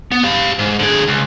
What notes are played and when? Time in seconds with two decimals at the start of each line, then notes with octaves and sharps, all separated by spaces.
0.12 B3
0.24 G4 F5
0.59 G#2
0.79 D3 G#4
1.08 C#2